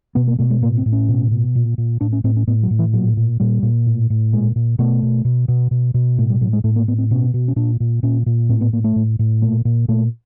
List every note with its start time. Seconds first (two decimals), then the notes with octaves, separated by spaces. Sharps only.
0.15 B2 B3
0.28 A#3
0.39 B2 A3
0.50 G#3
0.62 A2 A#3
0.77 C4
0.86 A2
0.92 C#4
1.09 B2
1.31 B2
1.55 A#2
1.78 A#2
2.01 A2 D4
2.13 C#4
2.24 A2 C4
2.36 C#4
2.47 A2 B3
2.63 F#3
2.70 A2
2.79 E3
2.93 A#2 F#3
3.17 A#2
3.40 A#2 G3
3.63 A#2
3.86 A2
4.10 A2
4.33 A#2 G#3
4.56 A#2
4.79 B2 A3
5.03 B2
5.25 B2
5.48 B2
5.71 B2
5.94 B2
6.18 A2 A3
6.30 G3
6.41 A2 F#3
6.53 G#3
6.64 A2 A3
6.76 A#3
6.88 A2 B3
6.99 C4
7.11 B2 C#4
7.34 B2
7.48 C#4
7.56 A#2 D4
7.80 A#2
8.03 A#2 C#4
8.26 A#2
8.49 A2 C4
8.61 B3
8.73 A2 A#3
8.84 A3
8.96 A2
9.19 A2
9.42 A#2 A3
9.65 A#2
9.88 A#2 A3